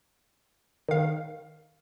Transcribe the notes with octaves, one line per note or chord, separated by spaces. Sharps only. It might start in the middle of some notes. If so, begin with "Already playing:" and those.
D#3 F5